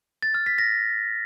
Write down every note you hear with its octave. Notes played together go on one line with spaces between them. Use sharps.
A6
F6
B6
A#6